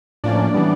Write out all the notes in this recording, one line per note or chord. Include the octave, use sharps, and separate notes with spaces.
A2 F3 A#3 C#4 D4 D5
C#3 E3 G3 B3